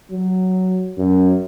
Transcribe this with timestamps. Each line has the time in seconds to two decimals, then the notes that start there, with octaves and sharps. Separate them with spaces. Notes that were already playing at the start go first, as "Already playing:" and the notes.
0.11 F#3
0.98 F#2